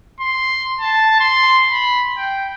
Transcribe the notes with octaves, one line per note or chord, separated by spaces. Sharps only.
C6
A5
C6
B5
G5